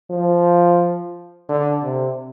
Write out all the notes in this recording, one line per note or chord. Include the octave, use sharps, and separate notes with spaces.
F3
D3
C3